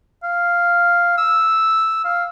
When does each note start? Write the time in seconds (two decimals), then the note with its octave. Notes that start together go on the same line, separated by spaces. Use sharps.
0.23 F5
1.18 E6
2.04 F5